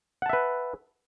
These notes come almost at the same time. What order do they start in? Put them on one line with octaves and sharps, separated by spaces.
F#5 A5 E5 B4